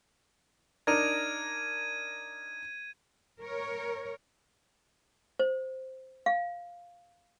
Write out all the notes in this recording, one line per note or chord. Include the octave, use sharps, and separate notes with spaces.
D4 D#4 A#4 G#6 D#7
A#4 C#5
C5
F5